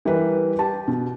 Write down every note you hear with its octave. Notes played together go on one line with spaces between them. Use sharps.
E3 G3 G4 A#4 B4
G4 A5
B2